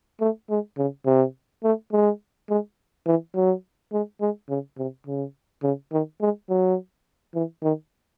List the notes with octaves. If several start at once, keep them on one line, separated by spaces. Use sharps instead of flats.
A3
G#3
C#3
C3
A3
G#3
G#3
E3
F#3
G#3
G#3
C#3
C3
C#3
C#3
D#3
G#3
F#3
E3
D#3